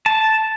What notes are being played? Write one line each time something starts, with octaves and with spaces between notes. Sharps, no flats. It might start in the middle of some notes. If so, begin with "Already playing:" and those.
A5